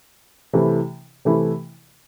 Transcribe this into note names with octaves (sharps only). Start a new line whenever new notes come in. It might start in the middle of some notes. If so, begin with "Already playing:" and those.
C3 E3 A3 E4
C3 E3 A3 E4